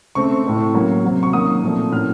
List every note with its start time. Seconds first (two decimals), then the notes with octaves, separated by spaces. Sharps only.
0.15 C#3 A3 C4 C#6
0.44 A2 A3 C4
0.74 C#3 F#3 A#3 C#4
1.04 C3 F#3 C4
1.23 C#6
1.33 D#3 F#3 A#3 C#4 D#6
1.63 A#2 F3 A3 C4
1.92 A2 F#3 A#3 C#4 F6